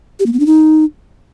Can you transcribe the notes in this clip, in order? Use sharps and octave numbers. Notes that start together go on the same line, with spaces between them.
G4
A#3
B3
D4
D#4